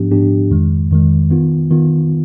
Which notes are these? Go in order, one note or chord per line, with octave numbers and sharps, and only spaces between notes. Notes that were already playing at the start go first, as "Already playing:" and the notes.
Already playing: G#2 F3 B3 D4 G4
G#2 F3 B3 D4 G4
F2 D#3 G#3
F2 D#3 G#3
D#3 B3 F4
D#3 B3 F4